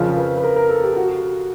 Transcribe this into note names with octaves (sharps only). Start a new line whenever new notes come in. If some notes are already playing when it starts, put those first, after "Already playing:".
Already playing: F2 C#3 F3 A#4
B4
B4
A#4
A#4
A4
G4
F#4